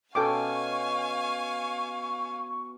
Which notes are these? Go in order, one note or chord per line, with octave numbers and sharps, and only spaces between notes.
B2 C#4 A4 F5 G5 G#5 C#6 D6